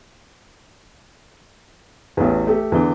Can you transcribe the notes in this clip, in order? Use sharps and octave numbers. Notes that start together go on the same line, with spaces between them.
A1 E2
A3 G4
E2 D3 E3